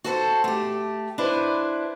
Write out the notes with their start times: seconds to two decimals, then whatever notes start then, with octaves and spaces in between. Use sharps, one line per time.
0.04 F#4 A4 B4 C5
0.44 A3 G4
1.18 D4 E4 B4 C5